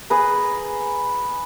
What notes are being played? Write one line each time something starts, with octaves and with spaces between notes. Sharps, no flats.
G#4 B4 A#5